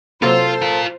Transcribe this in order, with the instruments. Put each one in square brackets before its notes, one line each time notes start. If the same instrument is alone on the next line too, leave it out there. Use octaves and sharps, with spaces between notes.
[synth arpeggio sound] C3 F#3 A#3 [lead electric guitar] F4 [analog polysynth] A4 [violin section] C5
[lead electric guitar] F4 A#4